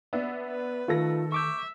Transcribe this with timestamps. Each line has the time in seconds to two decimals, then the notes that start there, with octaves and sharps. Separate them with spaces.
0.13 B3 D4 E5
0.47 B4
0.88 D#3 A3 F4 A4 A#6
1.32 E5 C#6 D6 G6